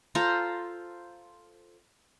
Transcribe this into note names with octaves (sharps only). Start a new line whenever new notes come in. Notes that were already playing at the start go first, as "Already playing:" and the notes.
F4 A4 C5 A#5